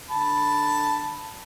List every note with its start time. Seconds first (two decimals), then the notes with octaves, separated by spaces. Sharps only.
0.10 D3 A5 B5